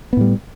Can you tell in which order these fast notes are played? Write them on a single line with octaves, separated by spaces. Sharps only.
B3 A2 G3